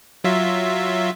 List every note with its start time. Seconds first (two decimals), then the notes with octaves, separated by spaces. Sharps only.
0.24 F#3 F4 E5